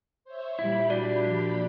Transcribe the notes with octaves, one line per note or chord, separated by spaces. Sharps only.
C5 C#5 E5
A#2 G3 E4 G4 B5
D4 F#4 D5
F3